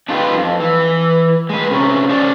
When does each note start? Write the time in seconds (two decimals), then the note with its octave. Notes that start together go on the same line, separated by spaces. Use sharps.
0.09 D4 D#4 F4 G4 B4
0.38 F2
0.60 E3
1.49 G#3 B4
1.71 C3 C#4
2.09 C#4 C5 D5